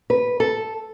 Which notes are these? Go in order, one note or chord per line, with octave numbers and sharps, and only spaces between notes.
B4
A4